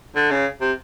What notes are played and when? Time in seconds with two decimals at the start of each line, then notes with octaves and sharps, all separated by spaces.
0.16 D3
0.31 C#3
0.61 C3